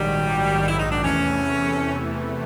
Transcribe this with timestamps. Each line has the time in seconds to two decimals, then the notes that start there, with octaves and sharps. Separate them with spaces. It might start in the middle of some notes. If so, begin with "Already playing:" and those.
Already playing: A#1 G#2 D#3 F#3 G3
0.69 E4
0.79 D#4
0.92 D4
1.04 E2 C3 E3 A3 C#4